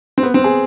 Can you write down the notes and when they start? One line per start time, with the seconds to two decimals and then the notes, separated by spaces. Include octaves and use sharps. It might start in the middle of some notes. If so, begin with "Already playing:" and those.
0.18 C4
0.23 B3
0.34 C4
0.44 G#4